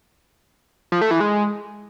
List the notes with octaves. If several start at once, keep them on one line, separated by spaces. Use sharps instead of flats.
F3
A3
E3
G#3